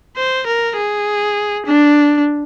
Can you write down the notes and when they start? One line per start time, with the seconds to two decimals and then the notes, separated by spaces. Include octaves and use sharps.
0.16 C5
0.47 A#4
0.76 G#4
1.66 D4